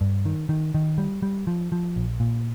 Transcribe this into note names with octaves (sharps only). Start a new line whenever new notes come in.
G2
D#3
D#3
D#3
G3
G3
F3
F3
A#1
A#2